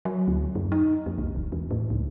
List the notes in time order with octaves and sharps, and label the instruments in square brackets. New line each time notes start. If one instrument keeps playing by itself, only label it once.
[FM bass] F#3
D2
F#2
D#4
F2
C2
D#1
E2
A2
C#2